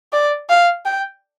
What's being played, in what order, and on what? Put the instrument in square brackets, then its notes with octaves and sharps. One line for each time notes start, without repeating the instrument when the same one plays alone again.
[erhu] D5
F5
G5